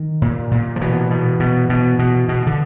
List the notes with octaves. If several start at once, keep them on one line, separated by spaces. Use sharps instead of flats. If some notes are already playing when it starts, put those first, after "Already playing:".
Already playing: D#3
A#2
A#2
F3
B2 E3
B2
B2
B2
B2
B2
D3